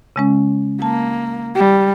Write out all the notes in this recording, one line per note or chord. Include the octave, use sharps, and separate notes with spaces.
C#3 G#3 C#4
A#3 A5
G3